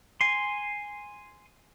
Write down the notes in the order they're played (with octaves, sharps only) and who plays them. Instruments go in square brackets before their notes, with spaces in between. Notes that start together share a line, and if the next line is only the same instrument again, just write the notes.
[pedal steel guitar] G#5 C6